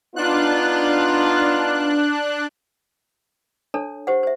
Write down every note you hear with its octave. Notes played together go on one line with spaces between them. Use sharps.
B3 D4 D#4 F4 F#6
D4 A4 C#5 A5
G4 C5 F#5
C5 E5